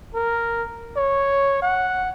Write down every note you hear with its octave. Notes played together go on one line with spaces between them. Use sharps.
A#4
C#5
F#5